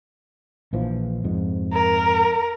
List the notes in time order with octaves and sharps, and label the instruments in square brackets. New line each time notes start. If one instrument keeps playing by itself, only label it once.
[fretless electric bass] A#1 E3 F3
F2 G#2
[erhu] A#4